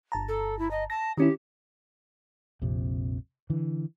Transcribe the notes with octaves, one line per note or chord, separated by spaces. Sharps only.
G1 A5 A#5
A4
E4
D#5
A5 A#6
D#3 C#4 E4 G4
A#1 F2 C3
D3 E3